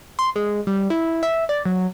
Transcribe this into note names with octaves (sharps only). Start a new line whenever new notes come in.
C6
G#3
G3
E4
E5
D5
F#3